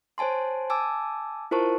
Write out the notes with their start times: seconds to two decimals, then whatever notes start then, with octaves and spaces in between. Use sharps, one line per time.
0.18 C5 C#5 G#5 A5 C6
0.70 G#5 A5 D6 E6
1.51 E4 F4 A#4 C5 A5 C#6